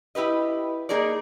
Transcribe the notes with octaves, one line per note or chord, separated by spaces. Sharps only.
E4 G4 B4 D#5
A#3 D#4 G#4 A#4 D5